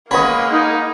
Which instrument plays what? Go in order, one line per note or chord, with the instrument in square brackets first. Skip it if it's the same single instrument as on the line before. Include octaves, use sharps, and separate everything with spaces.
[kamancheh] G#3 A#3 [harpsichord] B3 C#5 [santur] D#5 B5
[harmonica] D#4